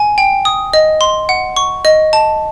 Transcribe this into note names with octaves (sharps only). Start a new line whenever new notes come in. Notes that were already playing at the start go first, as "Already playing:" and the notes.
Already playing: G#5
G5
D#6
D#5
C6
F#5
C#6
D#5
A5